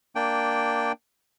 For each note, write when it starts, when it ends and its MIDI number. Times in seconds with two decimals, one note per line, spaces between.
0.15 0.92 58
0.15 0.92 62
0.15 0.92 79